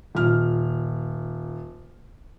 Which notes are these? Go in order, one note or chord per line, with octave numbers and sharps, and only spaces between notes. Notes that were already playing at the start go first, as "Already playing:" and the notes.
D#1 F6